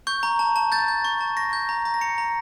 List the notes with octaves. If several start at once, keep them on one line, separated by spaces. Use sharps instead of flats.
C#6 G6
A#5
A5
A5
G6 A6
G6
C#6
A5
C#6 A#6
G6
A#5
A#5
A#6
A#5 C#7
A#5